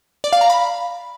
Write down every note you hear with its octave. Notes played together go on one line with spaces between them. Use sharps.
D5
F5
A#5
B5